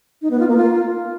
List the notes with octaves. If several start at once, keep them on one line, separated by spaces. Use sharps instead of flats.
D#4
B3
F4
A#3
F4